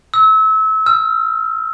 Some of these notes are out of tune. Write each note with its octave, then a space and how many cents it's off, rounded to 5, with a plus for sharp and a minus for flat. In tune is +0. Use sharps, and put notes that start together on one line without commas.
E6 -30
E6 +45